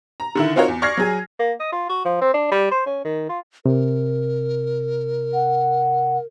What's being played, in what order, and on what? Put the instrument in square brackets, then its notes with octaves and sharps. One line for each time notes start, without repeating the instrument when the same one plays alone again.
[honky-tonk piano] A#5
D3 D#3 E4
C4 D#4 F4 F#4 A#4 C#5
E2
D5 C#6 F6 G#6 A#6 C7
F#3 G#4 G#5
[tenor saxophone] A#3
D#5
F4
F#4
F3
C4
D4
G3
C5
C#4
D#3
F4
[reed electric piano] C3 [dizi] A#4
[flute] F#5